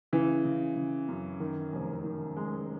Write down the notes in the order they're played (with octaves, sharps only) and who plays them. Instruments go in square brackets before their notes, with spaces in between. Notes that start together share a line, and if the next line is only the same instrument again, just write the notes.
[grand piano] C#3 [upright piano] E3
[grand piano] C#3
C#3
F#2
D#3
F1
D#3
G#3